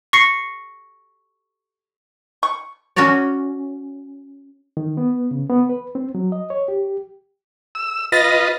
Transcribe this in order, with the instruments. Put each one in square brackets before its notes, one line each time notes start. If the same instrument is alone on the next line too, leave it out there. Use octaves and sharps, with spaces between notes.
[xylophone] C#6 A#6 C7 C#7
[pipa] C#6
[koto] C#4 F#4 A#4 C#5 D5
[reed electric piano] D#3
B3
C#3
B3
B4
C4
F#3
D#5
C#5
G4
[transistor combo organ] E6
[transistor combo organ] F4 B4 D#5 [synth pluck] A6 A#6